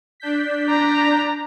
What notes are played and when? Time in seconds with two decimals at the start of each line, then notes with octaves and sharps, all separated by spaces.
0.20 D4 G6 B6
0.67 D5 A#5